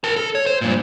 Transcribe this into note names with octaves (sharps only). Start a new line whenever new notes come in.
A#4 A5
A4
C#5
C5
G2 A#2